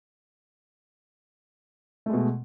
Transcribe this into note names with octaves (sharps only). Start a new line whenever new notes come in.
B2 G#3 A3